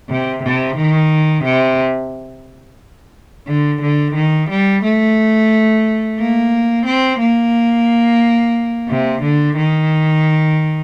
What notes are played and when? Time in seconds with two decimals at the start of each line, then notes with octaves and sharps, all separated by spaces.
0.10 C3
0.44 C3
0.78 D#3
1.44 C3
3.47 D3
3.82 D3
4.15 D#3
4.50 G3
4.84 A3
6.19 A#3
6.86 C4
7.20 A#3
8.89 C3
9.23 D3
9.57 D#3